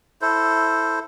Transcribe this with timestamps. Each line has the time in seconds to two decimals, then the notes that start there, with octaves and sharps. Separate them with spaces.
0.22 E4 A4 C5